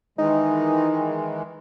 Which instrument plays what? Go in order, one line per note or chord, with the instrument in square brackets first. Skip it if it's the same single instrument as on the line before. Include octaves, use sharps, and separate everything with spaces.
[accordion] D#3 E3 G#3 [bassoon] D#4